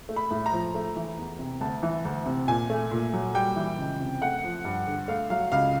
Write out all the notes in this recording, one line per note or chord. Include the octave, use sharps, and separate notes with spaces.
A3
B5
A2
A#5
F3
A3
E3
E2
C3
D2 A5
E3
D2
C3
A#2 G#5
A3
A#2
F#3
G3 G5
E3
C#2
C3
A3 F#5
F3
G2
D3
A3 F5
F#3 F5
C#2 F5